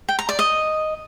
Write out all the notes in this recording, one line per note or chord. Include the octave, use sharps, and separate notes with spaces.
G5
A#5
D5
D#5